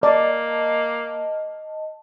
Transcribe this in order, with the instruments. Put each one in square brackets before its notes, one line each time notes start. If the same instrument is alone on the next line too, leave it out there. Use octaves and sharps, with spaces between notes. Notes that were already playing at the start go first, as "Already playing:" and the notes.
[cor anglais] A#3 [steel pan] D5 [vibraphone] D#5 A5